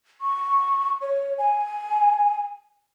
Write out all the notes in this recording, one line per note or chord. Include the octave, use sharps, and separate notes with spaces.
C#6
C#5
G#5